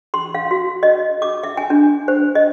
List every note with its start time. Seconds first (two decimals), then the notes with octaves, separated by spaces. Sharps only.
0.14 C6
0.35 F5
0.51 F#4
0.83 D#5
1.22 D6
1.43 E5
1.57 G#5
1.70 D4
2.08 C5
2.35 D#5